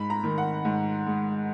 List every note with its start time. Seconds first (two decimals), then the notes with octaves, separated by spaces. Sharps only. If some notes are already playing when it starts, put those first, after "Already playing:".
Already playing: G#2 B5
0.10 A#5
0.24 D#3
0.38 F#5
0.65 G#2
1.06 G#3